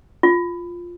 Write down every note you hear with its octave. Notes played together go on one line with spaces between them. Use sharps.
F4